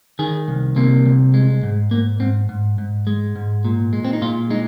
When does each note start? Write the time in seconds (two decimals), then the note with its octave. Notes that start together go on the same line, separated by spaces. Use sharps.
0.19 D#3 G#4
0.48 C2
0.76 C3 A#3
1.05 C2
1.34 G#3
1.63 G#2
1.91 G#2 A#3
2.20 G#2 C4
2.49 G#2
2.78 G#2
3.07 G#3
3.36 G#2
3.64 A#2
3.93 G#3
4.05 C4
4.13 D#4
4.22 A#2 F4
4.50 G#3 D#4